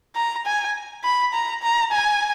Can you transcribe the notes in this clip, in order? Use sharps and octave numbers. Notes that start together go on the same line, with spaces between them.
A#5
G#5
B5
A#5
A#5
G#5